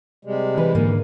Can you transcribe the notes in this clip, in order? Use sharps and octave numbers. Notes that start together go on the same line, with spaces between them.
C3 G3 G#3
E3 B4
G#2 D3 A#3